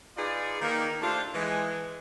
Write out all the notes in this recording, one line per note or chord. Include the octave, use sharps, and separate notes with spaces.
D#4 F4 G#4 B4 D5
D#3 A#3
A3 D4 F4 G4 A4 C5
E3 G#3